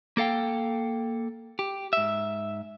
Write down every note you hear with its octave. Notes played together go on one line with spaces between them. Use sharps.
A#3 A4 F5 G5
G4
G#2 E5